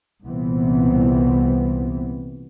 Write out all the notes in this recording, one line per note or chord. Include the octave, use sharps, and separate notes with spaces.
C2 A#2 E3 B3 C4